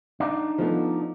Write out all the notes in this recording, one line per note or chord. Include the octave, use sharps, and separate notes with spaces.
D4 D#4
F3 A3 B3